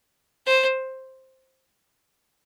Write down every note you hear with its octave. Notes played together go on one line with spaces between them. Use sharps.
C5